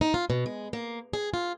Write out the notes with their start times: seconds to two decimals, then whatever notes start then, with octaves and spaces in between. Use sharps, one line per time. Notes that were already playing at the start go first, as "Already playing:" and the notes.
0.01 D#4
0.14 F4
0.30 B2
0.46 G#3
0.73 A#3
1.13 G#4
1.34 F4